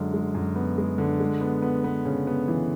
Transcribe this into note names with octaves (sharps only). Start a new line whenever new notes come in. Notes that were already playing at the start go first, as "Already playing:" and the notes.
Already playing: F#2 D3 G#3
G#3
F#2
B3
G#3
D3
G#3
B3
B3
B3
C#3
B3
E3